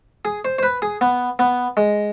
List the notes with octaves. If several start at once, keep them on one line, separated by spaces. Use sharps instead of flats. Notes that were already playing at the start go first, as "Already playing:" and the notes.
G#4
C5
C5
B4
G#4
B3
B3
G#3